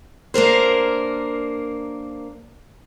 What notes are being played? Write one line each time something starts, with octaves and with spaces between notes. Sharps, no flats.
A#3 D4 A#4 C5